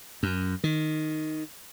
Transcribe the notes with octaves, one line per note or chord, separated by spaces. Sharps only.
F#2
D#3